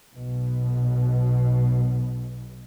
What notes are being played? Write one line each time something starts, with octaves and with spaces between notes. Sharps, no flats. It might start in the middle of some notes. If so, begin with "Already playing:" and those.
B1 B2